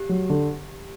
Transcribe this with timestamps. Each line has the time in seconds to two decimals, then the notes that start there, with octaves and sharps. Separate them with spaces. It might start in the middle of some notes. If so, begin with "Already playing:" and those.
Already playing: G4
0.09 F#3
0.30 D3